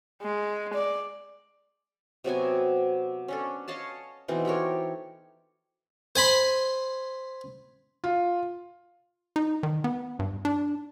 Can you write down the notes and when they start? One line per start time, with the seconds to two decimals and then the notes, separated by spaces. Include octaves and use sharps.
0.22 G#3
0.73 D5
2.24 C3 F#3 B3 G#5
3.28 C#4 D4 A4
3.68 C#5 D#5 F5 A5
4.28 B2 E3 C4 D#4
4.45 G4 A4 A#4 C#5
6.16 C5 G#5 B5 C6
8.04 F4
9.36 D#4
9.63 D#3
9.84 B3
10.19 G2
10.45 D4